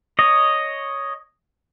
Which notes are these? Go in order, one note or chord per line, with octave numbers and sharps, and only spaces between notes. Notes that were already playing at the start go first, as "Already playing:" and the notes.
C#5 D#5